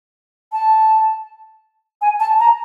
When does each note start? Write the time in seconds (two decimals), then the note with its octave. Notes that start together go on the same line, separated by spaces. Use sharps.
0.53 A5
2.01 G#5
2.20 A5
2.40 A#5